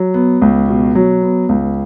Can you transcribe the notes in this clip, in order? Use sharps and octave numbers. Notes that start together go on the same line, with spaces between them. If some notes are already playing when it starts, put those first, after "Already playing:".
Already playing: F#3
B3
C#2
B2
F#3
B3
C#2